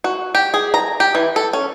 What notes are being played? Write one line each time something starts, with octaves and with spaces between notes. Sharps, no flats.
F#4
G4
G#4
A#5
G4
E3
A4
C#4